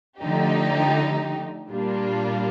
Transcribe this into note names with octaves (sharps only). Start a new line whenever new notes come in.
D3 F3 A3 D#4 G4
A#2 G3 A#3 D4 F4